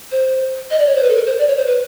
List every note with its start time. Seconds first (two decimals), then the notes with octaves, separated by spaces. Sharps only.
0.12 C5
0.71 D#5
0.79 D5
0.87 C#5
0.95 C5
1.02 B4
1.10 A4
1.15 A#4
1.27 C5
1.39 D5
1.48 C#5
1.57 C5
1.66 B4